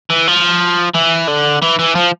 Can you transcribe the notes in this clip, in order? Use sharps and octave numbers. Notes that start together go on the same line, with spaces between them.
E3
F3
E3
D3
E3
E3
F3